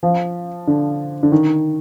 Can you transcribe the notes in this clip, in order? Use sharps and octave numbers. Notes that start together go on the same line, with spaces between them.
F3
D3
D3
D#3